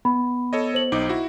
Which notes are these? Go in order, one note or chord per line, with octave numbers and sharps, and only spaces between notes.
B3 B5
A4 C#5 D#5
C5 F#7
B1 D#4 D6
E4 F#4